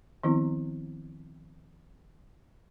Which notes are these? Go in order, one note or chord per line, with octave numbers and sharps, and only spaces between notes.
D#3 F3 B3 C4 E4